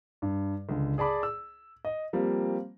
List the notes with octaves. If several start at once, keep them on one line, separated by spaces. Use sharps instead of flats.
G2
C#2 D3
G#4 D5 A5 B5 D6
E6
D#5
F3 G3 A#3 C4